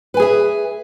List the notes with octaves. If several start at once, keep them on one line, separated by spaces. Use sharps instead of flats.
G#4 B4 E5 G#5